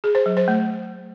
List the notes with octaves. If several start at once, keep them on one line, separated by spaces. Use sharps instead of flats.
G#4
C5
F#3
C5
A3